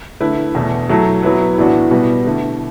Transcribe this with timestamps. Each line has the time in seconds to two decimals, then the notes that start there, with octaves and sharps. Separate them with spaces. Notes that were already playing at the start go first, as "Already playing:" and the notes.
0.21 D3 A3 E4 B4
0.55 E2 B2 A3
0.89 F#3 A3 E4 A4
1.23 F#3 B3 E4 B4
1.58 A2 E3 B3 D4 F#4
1.91 B2 G3 B3
2.25 D3 A3 E4